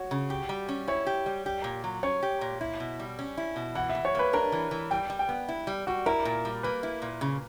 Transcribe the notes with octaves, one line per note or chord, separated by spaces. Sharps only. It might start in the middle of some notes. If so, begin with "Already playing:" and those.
Already playing: F#4 C#5
C#3
G4
G3
C#4
E4 C#5
G4
G3
G4
A#2
F#3
C#4 C#5
G4
A#2
E4
B2
G3
C#4
E4
B2
E3 F#5
E5
E3
C#5
A#3 B4
D4 A#4
E3
E3
G3 G5
G3
G5
B3
E4
G3
G3 F#4
E4 A#4
A#2
G3
A#3 B4
E4
A#2
C#3